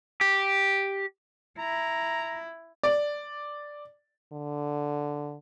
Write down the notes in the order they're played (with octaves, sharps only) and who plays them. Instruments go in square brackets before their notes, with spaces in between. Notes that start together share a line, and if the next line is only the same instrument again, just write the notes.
[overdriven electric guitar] G4
[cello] E4 [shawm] A#5
[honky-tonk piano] D5
[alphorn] D3